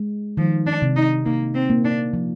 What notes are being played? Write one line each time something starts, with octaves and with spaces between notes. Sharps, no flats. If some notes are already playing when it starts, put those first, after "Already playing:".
Already playing: G#3
D#3 F3
D4
C3
D#4
A#3 D#4
C4
A#3
D4
F3